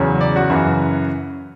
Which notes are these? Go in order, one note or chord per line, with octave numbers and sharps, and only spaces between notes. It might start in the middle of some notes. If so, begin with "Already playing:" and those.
Already playing: E2 C#3 F#3
D5
F#4
F#2 C#3 E3